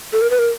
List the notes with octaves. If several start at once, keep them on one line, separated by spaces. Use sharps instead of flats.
A4
A#4
B4
A#4